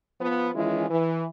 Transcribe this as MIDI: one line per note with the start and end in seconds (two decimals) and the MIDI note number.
0.21 0.49 53
0.21 0.49 59
0.55 0.88 51
0.55 0.88 52
0.55 0.88 56
0.55 0.88 61
0.55 0.88 64
0.55 0.88 65
0.89 1.25 52